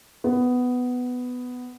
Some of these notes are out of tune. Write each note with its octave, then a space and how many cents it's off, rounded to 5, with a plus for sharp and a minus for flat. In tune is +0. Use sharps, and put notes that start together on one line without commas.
B3 +10